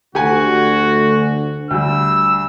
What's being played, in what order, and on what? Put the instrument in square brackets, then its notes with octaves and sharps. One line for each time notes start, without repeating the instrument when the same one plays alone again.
[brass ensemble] D2 [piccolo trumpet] F#4 [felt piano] G4 F#5 G#5
[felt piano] D2 G3 [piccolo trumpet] E6